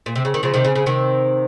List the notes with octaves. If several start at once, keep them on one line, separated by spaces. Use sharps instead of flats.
A#2
C3
C#3
D#3
C#3 F3
C3 D#3
C#3
C#3
C3 D#3